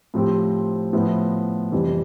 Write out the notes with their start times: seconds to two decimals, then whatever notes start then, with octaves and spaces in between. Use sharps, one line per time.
0.14 A2 F3 C4 G4
0.93 A2 F3 B3 E4
1.72 F2 C3 E3 G3